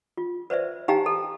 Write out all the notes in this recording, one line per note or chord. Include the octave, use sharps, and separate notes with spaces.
F4
B4 C5 D5 E5
D#4 G4 F5 G5 G#5 A#5
A4